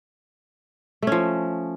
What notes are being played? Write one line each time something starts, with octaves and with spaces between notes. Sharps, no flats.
F3 A3 C#4